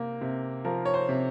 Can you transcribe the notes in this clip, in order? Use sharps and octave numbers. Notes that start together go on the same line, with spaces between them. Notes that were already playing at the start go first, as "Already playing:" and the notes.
Already playing: C3 A#3
C3
F3 A#4
C#5
C5
C3